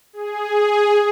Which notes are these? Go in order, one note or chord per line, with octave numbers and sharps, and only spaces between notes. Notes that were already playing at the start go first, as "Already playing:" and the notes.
G#4